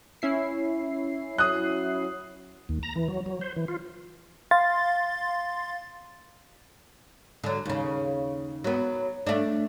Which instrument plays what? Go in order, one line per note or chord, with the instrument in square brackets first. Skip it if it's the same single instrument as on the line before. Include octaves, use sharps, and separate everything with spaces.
[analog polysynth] C#4 E4 C7
[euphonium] F#3 [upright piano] D#6 F#6
[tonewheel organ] D#2
A#5
E3
F#3
F#3
C5
E3
F4
[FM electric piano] F5 C6 A6
[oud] D3 F#3
D#2 C#3
F#3 B3
A3 D4